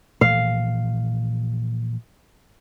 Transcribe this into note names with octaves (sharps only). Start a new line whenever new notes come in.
A#2 E3 F3 F5